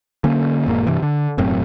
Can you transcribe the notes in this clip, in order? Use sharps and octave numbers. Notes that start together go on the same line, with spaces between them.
D3 A#3 C#4
E1 G#2 A#3
G2 C3 E3
D3
E1 F#2 A2 C4